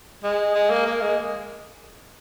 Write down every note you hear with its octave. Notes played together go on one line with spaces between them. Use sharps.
G#3
G#3
A#3
A#3
G#3